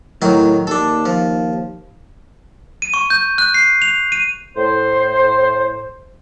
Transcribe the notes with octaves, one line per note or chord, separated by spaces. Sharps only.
A2 D#3 F#3 D#4
D#2 D4 A4
F3
D#7
C#6
G6
F#6
C7
F7
D#7
A2 C5